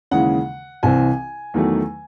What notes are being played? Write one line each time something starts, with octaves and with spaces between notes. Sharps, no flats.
D#2 C#3 E3 G#3 F#5
C2 C3 E3 C4 G#5
E2 D#3 F#3 A3